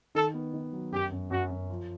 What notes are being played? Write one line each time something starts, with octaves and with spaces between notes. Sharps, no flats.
D#3 A4
B3
D#3
F#3
F#2 G4
F#2
F#2 F#4
F#2
F3